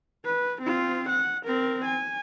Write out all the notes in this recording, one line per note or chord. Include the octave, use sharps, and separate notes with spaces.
B4
C4 F4
F#5
C4 A#4
G#5